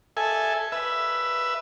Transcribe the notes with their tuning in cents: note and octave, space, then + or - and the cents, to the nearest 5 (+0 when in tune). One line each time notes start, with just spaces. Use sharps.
A4 -5 E5 +0 G#5 +0
B4 -5 E5 +10